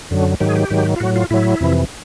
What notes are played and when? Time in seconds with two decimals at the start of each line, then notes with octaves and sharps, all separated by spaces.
0.11 F#2 D3 F#3
0.40 G#2 D#3 F#3 G4
0.49 G#4
0.55 G4
0.70 G#2 D#3 F#3
0.96 F4
1.00 A2 F#3 F#4
1.16 F4
1.31 A2 F#3 E4
1.60 F2 C3 E3